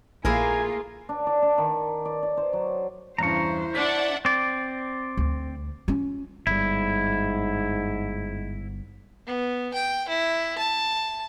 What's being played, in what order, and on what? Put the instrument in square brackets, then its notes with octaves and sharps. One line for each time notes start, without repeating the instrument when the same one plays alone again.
[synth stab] A#1 [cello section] A3 A#3 F4 [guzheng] E4 G#4 A#4 [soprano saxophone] G#5
[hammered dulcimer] D4
D5
D4
D#3
D5
D5
C5
F#3
[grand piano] E2 G2 C#3 [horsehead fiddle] E4 C5 [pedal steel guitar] A#5 C#6
[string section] D4 E5 F#5 [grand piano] B6
[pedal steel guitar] C4 D5
[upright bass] D2
C#4 F4
[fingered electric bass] G1 G3 [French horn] G#2 [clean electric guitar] E4
[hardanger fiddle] B3
G5
E4
A5